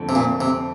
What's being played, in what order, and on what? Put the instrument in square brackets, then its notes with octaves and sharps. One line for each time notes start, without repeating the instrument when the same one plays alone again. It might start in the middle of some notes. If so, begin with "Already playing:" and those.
Already playing: [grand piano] F2 D3 A3 C4
[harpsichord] C3
A#2
C3